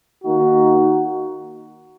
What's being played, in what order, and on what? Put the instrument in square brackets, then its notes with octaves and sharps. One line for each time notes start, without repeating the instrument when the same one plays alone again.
[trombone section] D#3 A#3 D#4 F#4